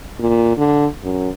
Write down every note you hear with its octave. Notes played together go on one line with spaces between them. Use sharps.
A#2
D3
F#2